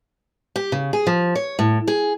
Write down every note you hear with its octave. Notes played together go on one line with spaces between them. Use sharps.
G4
C#3
G#4
F3
C#5
A2
G#4